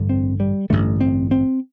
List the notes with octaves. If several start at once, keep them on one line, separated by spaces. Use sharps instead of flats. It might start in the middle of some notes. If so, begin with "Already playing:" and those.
Already playing: A1 G2 D3
C4
G3
A1 G2 D3 A3
C4
C4